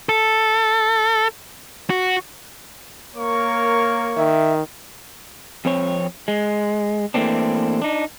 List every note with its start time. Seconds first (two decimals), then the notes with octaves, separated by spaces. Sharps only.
0.09 A4
1.90 F#4
3.15 A#3 A#4 C#5 C#6
4.17 D#3 E5
5.65 F2 C4 C#5
6.28 G#3
7.14 E3 A3 A#3 C4 D4
7.82 D4 D#4